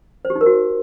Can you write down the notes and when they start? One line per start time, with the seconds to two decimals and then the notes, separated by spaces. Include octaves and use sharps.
0.25 C5
0.30 G4
0.35 D#4
0.41 A#4
0.46 F#4